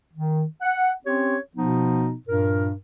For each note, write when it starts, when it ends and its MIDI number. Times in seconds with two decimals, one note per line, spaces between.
0.14 0.43 51
0.62 0.90 78
1.05 1.37 60
1.05 1.37 61
1.05 1.37 67
1.05 1.37 73
1.56 2.13 47
1.56 2.13 53
1.56 2.13 59
1.56 2.13 63
2.27 2.70 43
2.27 2.70 46
2.27 2.70 70